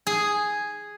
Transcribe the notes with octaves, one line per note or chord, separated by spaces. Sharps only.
G#4